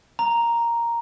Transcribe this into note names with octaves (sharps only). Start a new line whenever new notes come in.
A#5